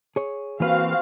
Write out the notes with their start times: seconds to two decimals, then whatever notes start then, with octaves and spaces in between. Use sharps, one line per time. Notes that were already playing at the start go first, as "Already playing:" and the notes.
0.16 G#4 C#5
0.60 E3 A#3 C4 F#4 B4 F5